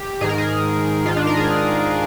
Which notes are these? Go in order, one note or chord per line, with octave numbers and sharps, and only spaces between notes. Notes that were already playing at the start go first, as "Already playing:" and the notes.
Already playing: G4
G#2 D#3 G#4
A#4
G#4
G#2 D#3 F4
D4
A#4
G#4